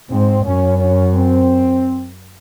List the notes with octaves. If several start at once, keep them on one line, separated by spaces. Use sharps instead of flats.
G#2 C4
F#2 C#4
C#4
C4